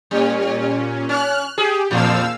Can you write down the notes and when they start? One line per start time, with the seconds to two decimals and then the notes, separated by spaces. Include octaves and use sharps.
0.11 A#2 G3 C#4
1.09 C#4 F6 F#6
1.58 G4 G#4
1.91 E2 A#2 F5 E6